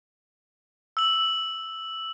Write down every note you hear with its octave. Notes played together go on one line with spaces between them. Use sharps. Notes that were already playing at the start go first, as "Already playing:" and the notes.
E6 F#7